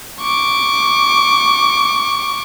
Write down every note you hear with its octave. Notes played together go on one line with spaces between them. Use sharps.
C#6 D6